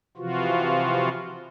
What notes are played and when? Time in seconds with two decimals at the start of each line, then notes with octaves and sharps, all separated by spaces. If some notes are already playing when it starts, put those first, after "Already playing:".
0.17 C3 E3 F3 F4 F#4